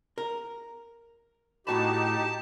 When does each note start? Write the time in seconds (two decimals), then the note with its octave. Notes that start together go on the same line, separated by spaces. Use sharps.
0.18 A#4
1.67 A2 D#4 F#4 G4 A5 B5